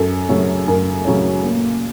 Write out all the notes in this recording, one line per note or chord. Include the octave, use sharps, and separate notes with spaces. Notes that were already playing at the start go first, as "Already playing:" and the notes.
Already playing: F#2 A4
C#3 F#3 A3 C#4
F#2 A#4
C#3 F#3 A3 C#4
A#2